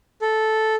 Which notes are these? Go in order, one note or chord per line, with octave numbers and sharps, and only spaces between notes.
A4